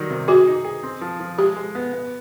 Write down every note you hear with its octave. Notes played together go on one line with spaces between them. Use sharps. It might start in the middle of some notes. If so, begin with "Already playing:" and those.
Already playing: D#3 F#3 G3
C3
F#4 G#4
D#4
G#4
C4
F3
F3
G#3 G4
G#3
B3
B3